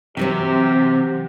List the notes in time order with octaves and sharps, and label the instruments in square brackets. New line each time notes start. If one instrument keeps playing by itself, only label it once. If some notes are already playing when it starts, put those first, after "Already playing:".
[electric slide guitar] C3 [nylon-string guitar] E3 F#3 C4 [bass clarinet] G4